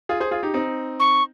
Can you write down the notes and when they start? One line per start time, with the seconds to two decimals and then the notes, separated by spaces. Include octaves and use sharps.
0.09 F4 G#4
0.20 G#4 C5
0.31 F4 G#4
0.43 D#4 G4
0.54 C4 D#4
1.00 C#6